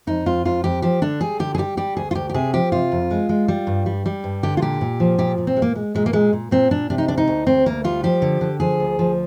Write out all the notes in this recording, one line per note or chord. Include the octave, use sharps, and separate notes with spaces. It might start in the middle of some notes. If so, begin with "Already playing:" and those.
F2 D#4
F2 F4
F2 F4
F2 G4
F3 G4
D3 D4
G3 G#4
D3 G4
G#4
G3 G4
G3 G4
D2 G#4
F4
D2 G4
G4
C3 G#4
F3 G4
C3 F4
F2
G#3
G#3
G3
G2
G3
G3
G2
D3 G4
F4
A#2 G4
A#2
F3
A#2 G4
A#2
C4
G#3
A#3
G#3
A#2 G#3
A#3
A#2 G#3
A#2
A#2 C4
A#2 D4
C3 D4
D#4
D2 D4
D#4
D2
D2 C4
D2 A#3
G3 F4
F3 G4
D3
D3
F3 G#4
D2
F3